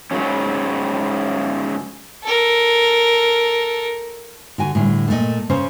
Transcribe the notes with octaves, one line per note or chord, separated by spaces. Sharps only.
G#2 C#3 F#3 C#4
A4 A#4
D3 F#4 G#5
A2 D3 G3
A#2 A3 D#5
C#3 C#4 C5